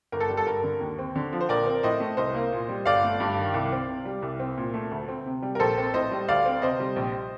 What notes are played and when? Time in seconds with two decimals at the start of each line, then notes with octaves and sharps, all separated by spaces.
0.12 G1 A#4
0.20 A4
0.29 G3
0.37 A4
0.46 G2 A#4
0.63 D3
0.80 D#2
0.98 C4
1.16 D3
1.33 F3
1.41 C5
1.49 A#1 A#4 D5
1.66 C4
1.83 A2 C5 D#5
2.00 A3
2.17 C2 C5 D#5
2.34 A#3
2.52 A#2
2.69 G3
2.86 G1 D5 F5
3.04 A3
3.20 G2
3.38 D#3
3.54 C2
3.72 C4
3.88 C3
4.05 G3
4.22 C2
4.40 C4
4.58 A#2
4.74 A3
4.91 D2
5.08 C4
5.26 C3
5.43 G3
5.55 A#4
5.59 A#1 A4 C5
5.78 C4
5.94 A2 C5 D#5
6.12 G3
6.28 D2 D5 F5
6.45 C4
6.62 C3 C5 D#5
6.80 G3
6.96 A#1